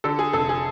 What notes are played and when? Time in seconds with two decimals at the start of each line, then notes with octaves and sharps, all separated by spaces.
0.04 D3 A4
0.19 G#4
0.33 F1 A4
0.49 G#4